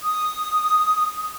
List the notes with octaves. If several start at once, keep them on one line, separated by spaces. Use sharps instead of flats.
D#6